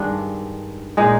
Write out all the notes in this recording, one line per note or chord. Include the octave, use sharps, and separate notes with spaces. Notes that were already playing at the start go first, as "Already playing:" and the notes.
Already playing: G2 D#3 G#3 D4
A#2 G#3 D#4 G#4